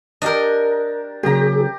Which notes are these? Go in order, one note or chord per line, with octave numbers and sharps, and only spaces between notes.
D4 G4 A#4 D#5
C#3 F#3 A#3 G4 G#4 A#5